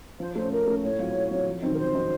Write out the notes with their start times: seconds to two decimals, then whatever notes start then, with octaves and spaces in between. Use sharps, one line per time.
0.20 F3 C5
0.35 A3 C#4 C5
0.52 F3 A#4
0.67 A3 C#4
0.83 A2 C#5
0.99 F#3 C4 F4
1.15 A2
1.31 F#3 C4 F4
1.47 F2
1.62 D#3 F#3 C4 D#4
1.74 A#4
1.78 F2 C5
1.94 D#3 F#3 C4 D#4